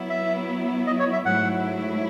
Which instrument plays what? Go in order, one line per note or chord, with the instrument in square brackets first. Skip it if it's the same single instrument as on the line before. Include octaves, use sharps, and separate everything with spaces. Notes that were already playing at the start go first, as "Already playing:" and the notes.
Already playing: [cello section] F#3 B3 E4
[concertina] E5
D#5
C#5
E5
[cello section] G#2 F#3 A3 E4 [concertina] F#5